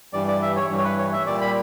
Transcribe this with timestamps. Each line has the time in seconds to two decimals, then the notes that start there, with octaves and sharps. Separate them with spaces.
0.13 G2 E3 G3 D5
0.28 D5
0.42 E5
0.56 C#5
0.70 G2 E3 G3
0.78 C#5
0.84 B4
0.98 C#5
1.13 E5
1.27 A#2 G3 D5
1.41 B5